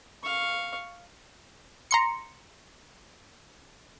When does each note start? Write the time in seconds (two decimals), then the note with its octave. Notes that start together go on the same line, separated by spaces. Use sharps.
0.23 F5 C#6
1.91 A#5 C6 C#7